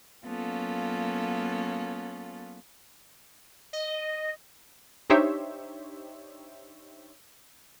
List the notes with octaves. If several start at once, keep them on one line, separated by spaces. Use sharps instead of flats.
F#3 A#3 B3 C#4 F4 A4
D#5
D4 D#4 G4 C5 C#5 E5